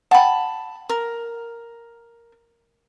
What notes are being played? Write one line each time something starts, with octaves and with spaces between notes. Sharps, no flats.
F#5 G5 A5 B5
A#4